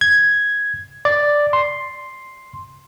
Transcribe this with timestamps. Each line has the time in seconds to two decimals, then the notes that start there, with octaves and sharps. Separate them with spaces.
0.01 G#6
1.05 D5
1.53 C6